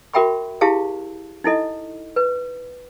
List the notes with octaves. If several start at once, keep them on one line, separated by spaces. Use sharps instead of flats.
F#4 A#4 E5 G5 B5 C#6
E4 G4 G#4 F5 A5
D#4 E4 A4 D#5
B4